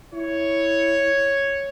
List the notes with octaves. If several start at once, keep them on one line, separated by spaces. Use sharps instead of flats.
E4 C#5